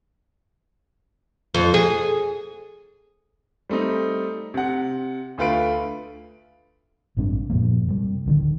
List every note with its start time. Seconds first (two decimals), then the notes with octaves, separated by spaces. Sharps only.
1.54 F2
1.74 G#4
3.69 G3 A3 C4 D#4
4.54 C3 F#5
5.38 D2 A3 F4 B4 F5 D7
7.17 A1 G2 C3 D4
7.50 F#2 A#2 F3 A#3
7.88 C3 G3
8.26 D1 D3 D#3